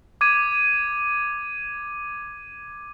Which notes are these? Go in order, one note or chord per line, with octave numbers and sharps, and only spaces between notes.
D6 G#6 D#7